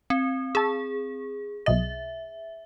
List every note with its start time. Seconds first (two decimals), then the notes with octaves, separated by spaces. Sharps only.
0.10 C4
0.55 G#4 A5 E6
1.66 B1 B2 D#5 E5